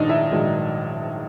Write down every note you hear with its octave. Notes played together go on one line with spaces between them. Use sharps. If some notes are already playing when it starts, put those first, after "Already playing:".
Already playing: A#1 G#2 D#3 F#3 D4 D#4 D#5
E4 E5
A#1 G#2 D#3 F#3